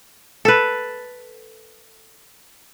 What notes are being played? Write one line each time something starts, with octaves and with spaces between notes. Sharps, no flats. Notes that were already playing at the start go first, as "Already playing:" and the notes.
A4 B4